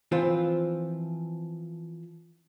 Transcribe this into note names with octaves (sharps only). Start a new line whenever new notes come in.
E3 F3 C4 F4